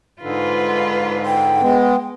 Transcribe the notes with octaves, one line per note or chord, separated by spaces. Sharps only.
G#2 D3 F4 B4
G5
G#3 B3